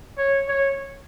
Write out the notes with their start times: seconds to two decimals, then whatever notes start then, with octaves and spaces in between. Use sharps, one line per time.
0.18 C#5
0.48 C#5